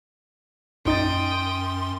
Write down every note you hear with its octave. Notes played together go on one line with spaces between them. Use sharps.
A#1 F#2 D#4 G5 C6 D#6 A6